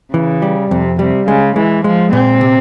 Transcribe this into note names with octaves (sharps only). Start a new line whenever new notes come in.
C#3 E3
G3
F2 C3
C3 G3
C#3 G#3
E3 G#3
F3 G#3
A#2 C4
C3